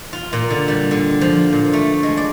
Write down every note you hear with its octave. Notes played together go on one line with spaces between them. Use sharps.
F4
A#2
D3
G3
D3
F3
A#2
A3
G#3
D5